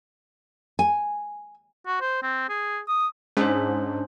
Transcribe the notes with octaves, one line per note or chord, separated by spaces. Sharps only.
G#5
F#4
C5
C4
G#4
D#6
G#2 C#4 D4 C5